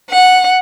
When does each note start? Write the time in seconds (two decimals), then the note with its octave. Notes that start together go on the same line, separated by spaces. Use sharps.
0.10 F#5